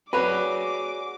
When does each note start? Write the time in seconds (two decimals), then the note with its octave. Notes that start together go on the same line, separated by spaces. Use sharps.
0.13 F#4 G#4 B4 C#5 D5 D6